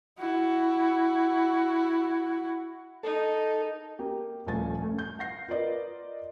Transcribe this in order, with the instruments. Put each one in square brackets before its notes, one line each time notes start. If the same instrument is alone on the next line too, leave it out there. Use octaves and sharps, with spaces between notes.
[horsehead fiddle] E4 F#4
[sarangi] D#4 [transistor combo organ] A4
[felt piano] A#3 G4
D#1 G2 F3 A3 G#5 A6
A3 C#4
G6
F5 F#5 A#6 C7
F4 A#4 B4 D5 D#5